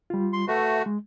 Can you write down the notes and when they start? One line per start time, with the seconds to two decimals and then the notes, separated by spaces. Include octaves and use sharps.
0.10 G3 F4
0.33 C6
0.48 A3 F#4 B4 E5 F#5
0.86 G#3